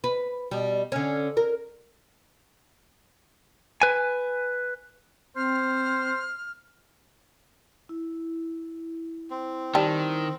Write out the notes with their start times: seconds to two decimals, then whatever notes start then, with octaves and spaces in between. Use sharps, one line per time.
0.04 B4
0.51 B2 G3
0.92 D3 C#4
1.37 A#4
3.82 B4 G#5
5.36 C4 C5 F6
7.89 E4
9.30 C4
9.75 D#3 G3 D4